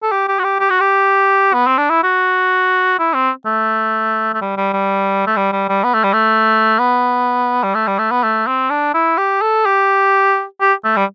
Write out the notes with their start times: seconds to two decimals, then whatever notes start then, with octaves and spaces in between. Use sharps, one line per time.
0.03 A4
0.12 G4
0.28 G4
0.39 F#4
0.44 G4
0.60 G4
0.70 F#4
0.80 G4
1.54 B3
1.67 C4
1.78 D4
1.90 E4
2.03 F#4
2.99 E4
3.14 C4
3.45 A3
4.34 A3
4.41 G3
4.57 G3
4.73 G3
5.27 A3
5.37 G3
5.52 G3
5.69 G3
5.84 B3
5.94 A3
6.04 G3
6.13 A3
6.79 B3
7.63 G3
7.75 A3
7.87 G3
7.99 A3
8.11 B3
8.23 A3
8.47 C4
8.70 D4
8.94 E4
9.18 G4
9.42 A4
9.66 G4
10.61 G4
10.84 A3
10.97 G3